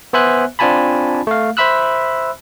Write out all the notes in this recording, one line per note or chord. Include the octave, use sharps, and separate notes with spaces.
B3 C5 E5 G#5 F#6
C4 D4 F4 G#5 A5 B5
A3 F5
C5 E5 B5 E6 F#6